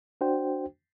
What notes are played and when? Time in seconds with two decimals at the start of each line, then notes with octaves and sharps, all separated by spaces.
0.21 D4 F#4 C5 G5